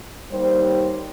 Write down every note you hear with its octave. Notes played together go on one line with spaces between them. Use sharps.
D#2 D#3 G3 C5